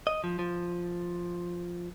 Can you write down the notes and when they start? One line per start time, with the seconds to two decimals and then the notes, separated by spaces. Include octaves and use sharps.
0.07 D#5
0.24 F3
0.39 F3